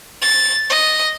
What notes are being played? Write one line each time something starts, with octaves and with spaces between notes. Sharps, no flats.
A6
D#5